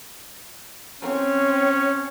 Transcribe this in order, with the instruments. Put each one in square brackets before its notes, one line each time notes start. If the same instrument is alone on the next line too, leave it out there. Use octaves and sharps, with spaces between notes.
[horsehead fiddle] C4 C#5 [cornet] C#4